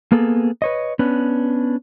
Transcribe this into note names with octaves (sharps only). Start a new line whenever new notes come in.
A#3 B3 G#4 A4
B4 C#5 D#5
B3 C#4 D4 B4